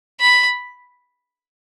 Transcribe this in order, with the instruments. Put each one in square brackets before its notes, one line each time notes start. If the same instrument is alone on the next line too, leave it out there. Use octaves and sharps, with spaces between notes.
[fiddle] B5